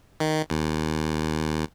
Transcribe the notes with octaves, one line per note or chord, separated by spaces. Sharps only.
D#3
D#2